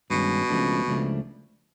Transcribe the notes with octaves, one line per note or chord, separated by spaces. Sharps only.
G2 B2 D#3 G#3 C#4
C#2 C#3 F3 A3 D4
C#2 C#3 F3 A3 D4